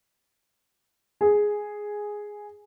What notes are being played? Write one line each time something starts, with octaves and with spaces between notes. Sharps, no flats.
G#4